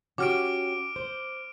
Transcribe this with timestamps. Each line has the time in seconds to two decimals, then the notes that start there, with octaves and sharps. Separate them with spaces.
0.18 C#4 F#4 G4 D6 F6 D7
0.96 C5